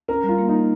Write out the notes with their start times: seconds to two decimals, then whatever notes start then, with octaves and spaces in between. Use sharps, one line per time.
0.08 C#4 A#4
0.23 G3
0.29 F4
0.39 A#3
0.49 D#4